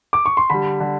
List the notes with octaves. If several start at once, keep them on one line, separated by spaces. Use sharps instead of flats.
D6
C#6
C6
D3 G3 B5
D3 G3